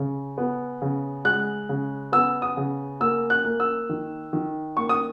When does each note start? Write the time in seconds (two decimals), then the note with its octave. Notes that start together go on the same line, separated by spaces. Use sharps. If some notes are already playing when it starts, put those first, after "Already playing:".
Already playing: C#3
0.38 B3
0.82 C#3
1.25 G#3 F#6
1.69 C#3
2.12 B3 E6
2.42 D#6
2.57 C#3
3.01 A#3 E6
3.30 F#6
3.45 A#3
3.60 E6
3.89 D#3
4.33 D#3
4.77 A#3 C#6
4.89 D#6